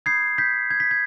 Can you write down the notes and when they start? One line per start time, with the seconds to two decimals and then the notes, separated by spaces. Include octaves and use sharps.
0.06 B5 D#6 G6 G#6 C7
0.38 G6 B6
0.71 G#6
0.80 B6
0.91 G#6